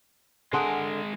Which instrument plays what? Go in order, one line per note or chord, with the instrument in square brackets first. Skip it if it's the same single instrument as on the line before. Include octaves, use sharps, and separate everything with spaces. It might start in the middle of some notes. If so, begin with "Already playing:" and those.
[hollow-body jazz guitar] D3 C6 [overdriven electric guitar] G#3 A#4 [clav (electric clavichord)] G#4 F#5 A5